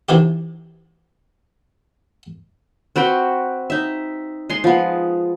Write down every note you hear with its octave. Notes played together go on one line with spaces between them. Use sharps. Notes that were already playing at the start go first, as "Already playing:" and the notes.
B1 C3 E3 E4 G4
C4 F#4 B4 G5
D#4 E5
G#3 G#4 C6
F3 B3